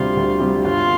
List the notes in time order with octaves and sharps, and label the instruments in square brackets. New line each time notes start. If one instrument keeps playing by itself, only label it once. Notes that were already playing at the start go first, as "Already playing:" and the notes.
Already playing: [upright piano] D2 C3 G3 C4 G4 [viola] F4
[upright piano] D2
C3 G3 C4 G4
[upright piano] G1 [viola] F4